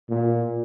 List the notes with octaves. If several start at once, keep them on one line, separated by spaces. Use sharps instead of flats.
A#2